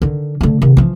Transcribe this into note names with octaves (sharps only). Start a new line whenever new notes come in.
D3 D#3
D3 A3
C3 D#3
E3 F3